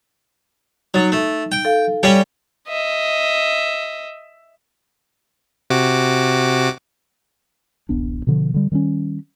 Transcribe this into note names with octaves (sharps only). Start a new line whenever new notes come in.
F#3 D#4 A6
A3
G5
A4 F5
G3 C#4 G4
D#5 E5
C3 F#4 D6
D1 A1 B3 D4
B2 D3 F3
D3 G3
D#3 G3 A3 C#4